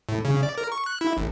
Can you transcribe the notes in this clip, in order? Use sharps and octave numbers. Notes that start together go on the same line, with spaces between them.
A2
C#3
D5
A#4
C#6
F#6
E4
A1